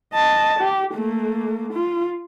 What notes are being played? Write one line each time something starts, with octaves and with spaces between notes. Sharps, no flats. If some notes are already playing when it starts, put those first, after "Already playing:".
D#5 A5
G4
A3 A#3
F4